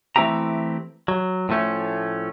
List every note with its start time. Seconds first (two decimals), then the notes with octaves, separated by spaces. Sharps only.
0.16 E3 A3 C4 E4 G4 A#5
1.08 F#3
1.49 A2 F3 A3 C#4